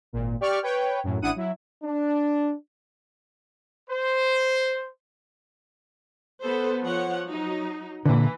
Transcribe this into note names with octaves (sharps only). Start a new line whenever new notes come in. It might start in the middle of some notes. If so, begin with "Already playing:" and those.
G#1 A#2
G4 D5 C#6 F6
B4 C#5 G5
F#2 A2
A1 D4 E4 F#5 D#6 D#7
F#3 E4
D4
C5
B3 A4 C5
F3 C#5 F#5
F#3 D#4
A#2 D3 E3